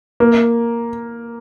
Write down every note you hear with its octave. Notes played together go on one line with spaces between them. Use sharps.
A#3